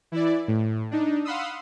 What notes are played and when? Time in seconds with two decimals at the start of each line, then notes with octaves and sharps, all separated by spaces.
0.12 E3 E4 D5
0.48 A2
0.91 D4 D#4
1.25 F5 F#5 B5 C6 D#6 E6